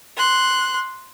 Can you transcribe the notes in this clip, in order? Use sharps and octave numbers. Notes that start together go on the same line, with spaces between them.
C6 F#6